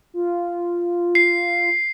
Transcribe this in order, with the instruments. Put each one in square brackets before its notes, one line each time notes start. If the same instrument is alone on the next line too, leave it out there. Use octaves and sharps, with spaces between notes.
[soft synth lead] F4
[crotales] C7